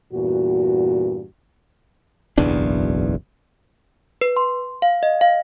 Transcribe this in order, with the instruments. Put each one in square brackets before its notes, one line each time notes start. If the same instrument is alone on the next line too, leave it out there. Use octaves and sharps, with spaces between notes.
[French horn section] E2 G2 A#2 F#4
[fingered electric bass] F#1 B1 E2 D4
[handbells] B4
C6
F5
D#5
F5